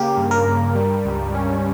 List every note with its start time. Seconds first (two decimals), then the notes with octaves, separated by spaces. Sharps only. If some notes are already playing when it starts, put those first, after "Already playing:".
Already playing: C#3 A#3 G4
0.17 G2
0.31 A#4
0.46 G2
0.75 G3
1.05 C#2
1.34 C#4